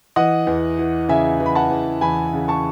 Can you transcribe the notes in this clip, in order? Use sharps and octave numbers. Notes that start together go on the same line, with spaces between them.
E3 D#5 F#5
E2
E3
C#3 E5 G#5
E3
B5
F#5 A5
E2
E2 G#5 B5
C#3
A5 C#6